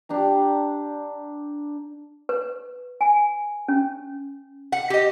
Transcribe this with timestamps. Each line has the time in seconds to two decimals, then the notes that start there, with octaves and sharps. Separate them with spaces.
0.09 D4 G4 A#5
2.29 B4
3.01 G#5
3.68 C#4
4.72 F#5
4.90 G4 D#5